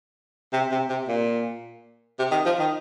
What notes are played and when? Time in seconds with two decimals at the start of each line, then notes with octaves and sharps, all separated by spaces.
0.53 C3
0.72 C3
0.89 C3
1.08 A#2
2.19 C3
2.32 D#3
2.46 F3
2.59 D#3